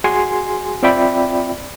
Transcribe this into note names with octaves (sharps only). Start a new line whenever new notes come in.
F#4 G#4 G#5 C6
C4 F4 D5 E5 G5 B5